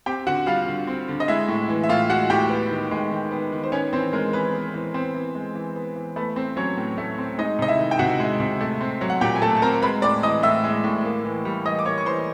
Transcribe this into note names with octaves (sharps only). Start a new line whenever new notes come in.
C4 G4 G5
D3 F#4 F#5
G3 F4 F5
D3
C4
D3
D#5
G#3 E4 E5
A2
E3
E5
A2 F4 F5
G#3 F#4 F#5
A2 G4 G5
B3
D#3
G#3
D#3
B3
D#3
C5
B3 C#4 C#5
E3 C4 C5
G#3 A#4
E3 B3 B4
B3
E3
B3 C4 C5
E3
G#3
E3
B3
E3
A3 B3 B4
C4 C5
F#3 C#4 C#5
A2
A3
C4
G#3 D#4 D#5
C3 D#5
E4 E5
D#3
G5
C3 F#4 F#5
G#3
C3
A3
C4
F#3
F#5
A#2 G4 G5
G#5
A3 A4 A5
A5
C4 A#4 A#5
G#3 B4 B5
A2 D5 D6
E3 D#5 D#6
A2 E5 E6
G#3
A2
A#3
E3
G3
E3 D#5 D#6
D6
A#3 C#5 C#6
C#6
E3 C5 C6